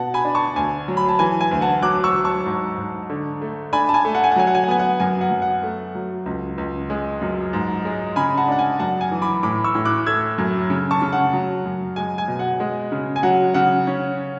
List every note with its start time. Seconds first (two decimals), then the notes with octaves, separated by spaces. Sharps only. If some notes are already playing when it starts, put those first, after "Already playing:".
Already playing: B2 F#5 A5
0.14 G#5 B5
0.25 D4
0.35 A5 C#6
0.56 D2 G#5
0.88 F#3
0.97 B5
1.09 A5
1.19 E3 G#5
1.41 G#5
1.51 D2
1.61 F#5 A5
1.83 F#3 D6 F#6
2.04 C#6 E6
2.14 F#3
2.25 A5 C#6
2.46 G#2
2.77 G#2
3.10 D3
3.41 A3
3.73 D4 G#5 B5
3.89 A5
3.94 G#5
4.05 A3
4.15 F#5
4.24 G#5
4.32 F#5
4.36 F#3 G#5
4.47 F#5
4.55 G#5
4.64 F#5
4.68 B3 G#5
4.79 F#5
5.00 F#2 G#5
5.21 F#5
5.31 F#2
5.42 F#5
5.63 A3
5.95 F#3
6.26 C#2
6.58 C#2
6.90 G#3
7.21 F#2
7.53 G#2
7.85 G#3
8.16 C#3 G#5 B5
8.37 F#5 A5
8.48 D4 F#5
8.59 G#5
8.79 F#2 F#5 A5
9.01 G#5
9.11 E3
9.22 B5 D6
9.43 A2 B5 D6
9.64 C#6 E6
9.75 A2
9.85 D6 F#6
10.07 A3 E6 G#6
10.38 F#2
10.70 C#3
10.91 A5 C#6
11.02 C#3
11.13 F#5
11.33 F#3
11.65 F#2
11.96 G#3 G#5
12.18 G#5
12.28 B2
12.39 F#5
12.60 G#3
12.92 C#3
13.16 G#5
13.23 F#3 F#5
13.54 C#3 F#5
13.87 C#4